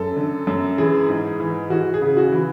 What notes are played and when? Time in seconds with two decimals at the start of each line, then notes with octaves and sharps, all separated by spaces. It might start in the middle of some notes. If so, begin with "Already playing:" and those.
Already playing: F#2 A4
0.16 D3
0.47 F#2
0.78 E3 G#4
1.09 G#2
1.40 E3
1.70 E3 F#4
1.94 G#4
2.01 C#3
2.17 F#4
2.32 E3